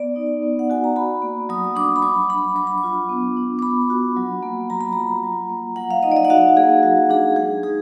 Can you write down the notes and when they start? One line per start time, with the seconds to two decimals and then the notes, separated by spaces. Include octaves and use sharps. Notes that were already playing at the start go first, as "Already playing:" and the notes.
Already playing: B3 D5
0.16 D#4
0.43 B3
0.59 F#5
0.70 F#4 G#5
0.84 A#5
0.96 F#4 B5
1.22 A#3
1.49 F#3 D#6
1.76 D4 D6
1.96 B5
2.02 F#3 D6
2.29 D4 B5
2.56 F#3 D6
2.67 B5
2.78 D6
2.83 F4
3.09 B3
3.37 D4
3.59 D6
3.62 B3 B5
3.90 F#4
4.17 F#3
4.43 A#3
4.70 F#3 A#5
4.81 B5
4.93 F4 A#5
5.24 F#3
5.50 A#3
5.76 F#3 F#5
5.91 F5
6.03 D#4 D#5
6.12 D5
6.17 D#5
6.25 F#5
6.30 F#4 F5
6.57 A#3 G#4
6.83 F#3 F#4
7.10 D4 G#4
7.36 G#3 G#4
7.63 D#4 G#4